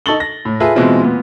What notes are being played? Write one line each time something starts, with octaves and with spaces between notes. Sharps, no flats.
D#4 A4 C#6 A6 F#7 G7
A#6
A2
F4 G#4 A4 B4 E5
B2 E3 G#3 C4 E4 F4
A#2 B3